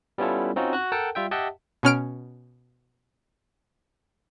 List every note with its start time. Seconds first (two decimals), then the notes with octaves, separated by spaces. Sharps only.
0.18 G3 B3 C#4 E4 F4 A4
0.56 C4 C#4 D#4 F4 F#4
0.73 F#4 F#6
0.92 A4 A#4 F#5 G5 A5
1.15 G3 F4 E5 G5
1.31 G4 D#5 E5 F#5 G5 A5
1.83 B2 C#4 F6 D7